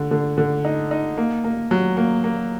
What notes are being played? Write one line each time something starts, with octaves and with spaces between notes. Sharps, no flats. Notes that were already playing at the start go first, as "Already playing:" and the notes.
Already playing: D3
D3
D3
D#4
D#4
A#3
A#3
F#3
A#3
A#3